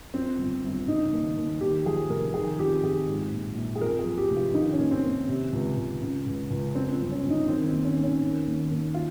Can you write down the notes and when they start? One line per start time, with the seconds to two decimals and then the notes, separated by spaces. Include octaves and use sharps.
0.14 F2 C4
0.39 G1
0.64 G1
0.87 C#3 D#4
1.13 D#2
1.37 D#2
1.61 D#2 G4
1.86 F3 G#4
2.09 F1 A#4
2.34 D#3 G#4
2.58 F2 G4
2.83 F2 G#4
3.07 G#2
3.32 A#1
3.56 A#1
3.75 G#4
3.81 F2 A#4
3.99 G#4
4.06 F3
4.18 G4
4.30 F1
4.36 F4
4.54 D#3 D#4
4.73 C#4
4.79 D#2
4.91 C4
5.04 D#2
5.28 C3
5.53 C#2
5.77 C#2
6.02 C#3
6.26 C#2
6.50 C#2
6.74 F2 C4
6.93 C4
7.00 G1
7.12 C#4
7.24 G1
7.30 D#4
7.48 D#3 C4
7.67 C4
7.72 D#2
7.85 C#4
7.97 D#2
8.04 C#4
8.21 D#3
8.46 D#2
8.71 D#2
8.94 F4